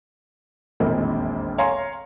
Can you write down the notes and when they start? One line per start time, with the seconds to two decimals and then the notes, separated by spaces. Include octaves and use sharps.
0.80 E1 A#1 F2 D#3 A#3 C4
1.58 C#5 F5 G#5 A#5 C6